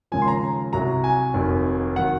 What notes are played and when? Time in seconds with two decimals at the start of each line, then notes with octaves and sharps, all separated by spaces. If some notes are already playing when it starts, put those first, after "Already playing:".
0.12 D#2 C#3 F3 G#3 G#5
0.22 C6
0.28 A#5
0.73 C2 C3 F#3 A#5
1.04 G#5
1.34 F1 D#2 D#3 F#3
1.96 D#3 F#3 F#5